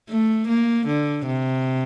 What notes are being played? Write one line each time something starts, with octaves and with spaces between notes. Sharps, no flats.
A3
A#3
D3
C3